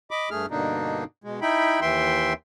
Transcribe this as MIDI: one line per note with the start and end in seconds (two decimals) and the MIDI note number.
0.11 0.29 75
0.11 0.29 83
0.11 0.29 86
0.31 0.46 43
0.31 0.46 57
0.31 0.46 68
0.31 0.46 89
0.51 1.04 43
0.51 1.04 47
0.51 1.04 50
0.51 1.04 58
0.51 1.04 62
0.51 1.04 63
1.24 1.40 47
1.24 1.40 56
1.42 1.80 63
1.42 1.80 64
1.42 1.80 79
1.42 1.80 83
1.81 2.33 39
1.81 2.33 52
1.81 2.33 76
1.81 2.33 79
1.81 2.33 84